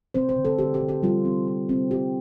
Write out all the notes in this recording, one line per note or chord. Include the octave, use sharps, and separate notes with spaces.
C4 C5
C5
D3
A4
D3 G4
G4
D3
G4
G3 F4
C4
F4
C4
F4 G4